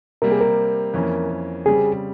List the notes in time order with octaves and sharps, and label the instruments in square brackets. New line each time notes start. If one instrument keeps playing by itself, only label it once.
[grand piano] C3 G3 A#3 [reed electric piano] A#4
[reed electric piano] G#4
A#4
[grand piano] F2 E3 A#3 C#4
[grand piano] C#3 G3 C4 [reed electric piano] G#4